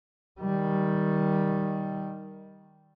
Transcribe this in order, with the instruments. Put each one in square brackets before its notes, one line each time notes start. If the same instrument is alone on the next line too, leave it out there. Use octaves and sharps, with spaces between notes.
[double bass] D#3 G3